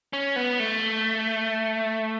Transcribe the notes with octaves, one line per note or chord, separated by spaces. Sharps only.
C#4
B3
A3